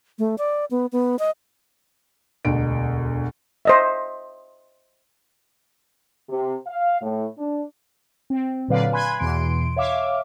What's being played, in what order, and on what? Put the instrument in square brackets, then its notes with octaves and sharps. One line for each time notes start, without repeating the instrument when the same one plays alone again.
[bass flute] A3
D5
B3
B3
D#5
[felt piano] E1 D2 B2 D7
[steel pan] C5 D#5 E5
[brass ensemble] C3
F5
A2
D4
[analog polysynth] C4
A#2 D3 F#3 B4 D5 F5
G#5 B5 C6 F#6 G#6
E2 B2 E3 C6 D7
C#5 E5 F5 D6